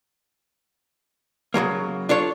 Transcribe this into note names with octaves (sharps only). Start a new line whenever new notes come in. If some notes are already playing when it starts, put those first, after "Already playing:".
C#3 F3 F#3 A#3
D4 F4 A4 C#5